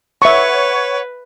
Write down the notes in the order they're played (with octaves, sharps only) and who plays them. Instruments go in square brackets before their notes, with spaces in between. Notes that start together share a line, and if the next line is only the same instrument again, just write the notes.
[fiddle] B4 [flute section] C#5 F#5 [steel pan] E5 C#6